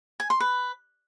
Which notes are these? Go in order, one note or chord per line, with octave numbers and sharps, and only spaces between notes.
G#5
C6
B4